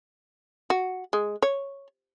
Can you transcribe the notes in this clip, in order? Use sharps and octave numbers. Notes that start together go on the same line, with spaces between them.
F#4
G#3
C#5